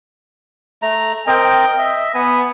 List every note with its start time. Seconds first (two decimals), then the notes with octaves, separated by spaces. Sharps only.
0.82 A3 A#5
1.27 C4 A#4 D#5 G5
1.78 D#5 E5
2.14 B3 G#5